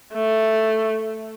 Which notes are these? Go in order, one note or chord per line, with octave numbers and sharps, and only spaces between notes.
A3